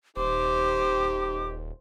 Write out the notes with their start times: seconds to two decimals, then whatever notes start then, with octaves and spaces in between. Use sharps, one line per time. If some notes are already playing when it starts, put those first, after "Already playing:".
0.17 D#1 D#4 G4 C5 D6